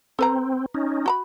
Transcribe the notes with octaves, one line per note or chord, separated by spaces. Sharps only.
C4 A4 B4 A#5
C#4 D#4
F#4 A#5 B5